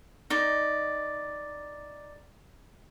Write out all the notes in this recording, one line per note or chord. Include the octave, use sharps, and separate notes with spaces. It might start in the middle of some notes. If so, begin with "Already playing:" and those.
D#4 D5